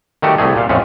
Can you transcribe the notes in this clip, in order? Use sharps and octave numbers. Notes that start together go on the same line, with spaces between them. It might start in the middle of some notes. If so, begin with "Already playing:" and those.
D#3 G3 A3 F#4 G4
C2 G3 A3 G#4
A#2 F5
F2 A2 G#3 A3 C#4